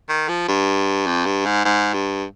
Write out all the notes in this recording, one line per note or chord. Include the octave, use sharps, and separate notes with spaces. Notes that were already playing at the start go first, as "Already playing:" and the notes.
D#3
F3
G2
F2
G2
G#2
G#2
G2